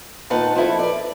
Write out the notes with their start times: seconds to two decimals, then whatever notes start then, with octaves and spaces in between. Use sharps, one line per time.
0.30 A#2 D#3 D#4 B4 F#5 A5
0.55 F3 E4 A4
0.79 B4 D5